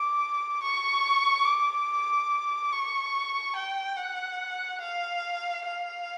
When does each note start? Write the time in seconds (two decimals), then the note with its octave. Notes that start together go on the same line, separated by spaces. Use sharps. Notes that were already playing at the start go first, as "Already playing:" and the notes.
Already playing: D6
0.62 C#6
1.46 D6
2.72 C#6
3.55 G5
3.97 F#5
4.81 F5
5.65 F5